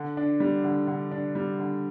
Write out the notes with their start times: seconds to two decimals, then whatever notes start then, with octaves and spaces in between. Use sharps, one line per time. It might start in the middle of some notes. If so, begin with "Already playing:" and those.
Already playing: D3
0.17 D4
0.40 G3
0.64 D3
0.87 D3
1.11 D4
1.35 G3
1.59 D3